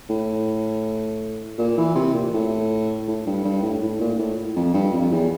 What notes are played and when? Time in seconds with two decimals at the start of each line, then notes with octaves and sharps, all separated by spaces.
0.10 A2
1.58 A#2
1.78 E3
1.95 C3
2.14 A#2
2.33 A2
3.08 A2
3.26 G2
3.44 G2
3.62 A2
3.82 A2
4.01 A#2
4.18 A2
4.56 F2
4.74 G2
4.93 F2
5.12 E2